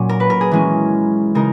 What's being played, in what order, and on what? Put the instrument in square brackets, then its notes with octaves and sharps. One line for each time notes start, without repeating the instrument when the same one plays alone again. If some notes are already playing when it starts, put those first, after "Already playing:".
Already playing: [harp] A#2 F#3 C#4
A#4
B4
A#4
G#4
E3 G#3 C#4
C#3 G#3 D#4 A#4